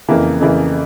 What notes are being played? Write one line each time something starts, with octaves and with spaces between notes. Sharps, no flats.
F2 C#3 E3 A#3
F2 C#3 E3 A#3